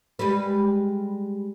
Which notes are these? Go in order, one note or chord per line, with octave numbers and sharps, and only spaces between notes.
G3 G#3 B4